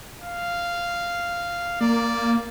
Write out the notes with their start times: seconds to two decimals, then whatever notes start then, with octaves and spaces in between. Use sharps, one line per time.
0.21 F5
1.81 A#3 D5